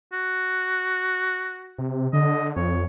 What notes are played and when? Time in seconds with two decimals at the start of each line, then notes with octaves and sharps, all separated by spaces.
0.13 F#4
1.78 C3
2.13 D3 D#5
2.56 F2 C#5